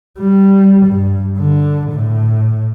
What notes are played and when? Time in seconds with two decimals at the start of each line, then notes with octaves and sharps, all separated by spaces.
0.19 G3
0.87 G2
1.38 D3
1.92 A2